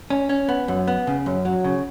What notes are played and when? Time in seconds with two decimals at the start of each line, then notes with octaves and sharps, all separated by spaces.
0.10 C#4
0.29 C#4
0.49 B3
0.68 F#2
0.88 B3
1.07 C#3
1.26 F#2
1.45 F#3
1.64 C#3